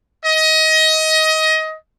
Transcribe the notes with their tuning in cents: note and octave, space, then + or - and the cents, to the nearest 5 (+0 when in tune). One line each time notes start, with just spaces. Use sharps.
D#5 +25